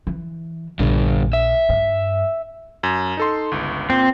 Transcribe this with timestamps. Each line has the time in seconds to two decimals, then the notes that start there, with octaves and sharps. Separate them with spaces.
0.07 E3
0.79 A#1 G2 D3
1.33 E5
1.69 G2
2.83 F#2
3.17 D#4 A4 C6
3.51 G1 C#2
3.90 A#2 C4